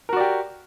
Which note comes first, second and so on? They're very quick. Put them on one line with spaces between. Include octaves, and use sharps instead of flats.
A#4 F#4 D5 G4